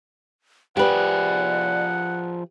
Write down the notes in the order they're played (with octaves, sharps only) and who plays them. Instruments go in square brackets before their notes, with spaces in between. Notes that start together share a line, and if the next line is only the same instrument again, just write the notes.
[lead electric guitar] F3 G#4 [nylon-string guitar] G4 B4 [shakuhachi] D5 [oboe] F#5